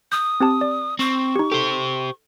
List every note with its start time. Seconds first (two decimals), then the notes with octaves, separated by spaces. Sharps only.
0.12 D#6 G6
0.40 C4 G4 A5
0.61 D5
0.99 C4 C#6
1.36 D#4 G4
1.52 G4 A4 C5